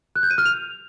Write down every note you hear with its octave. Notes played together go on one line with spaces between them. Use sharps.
F#6
G6
D#7
F6
F7